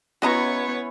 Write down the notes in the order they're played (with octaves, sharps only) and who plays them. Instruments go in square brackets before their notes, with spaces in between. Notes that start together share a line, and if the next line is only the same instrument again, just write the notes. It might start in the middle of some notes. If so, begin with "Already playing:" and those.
[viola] B3 C#5 [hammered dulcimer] C#4 E4 [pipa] F#4 D#5 A#5